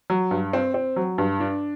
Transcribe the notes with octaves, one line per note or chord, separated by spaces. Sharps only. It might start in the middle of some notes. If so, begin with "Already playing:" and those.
F#3
G2
C4
C4
F#3
G2
D4